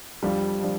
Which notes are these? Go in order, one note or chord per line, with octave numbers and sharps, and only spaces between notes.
F2 F3 G3 D4 F4
F3 D4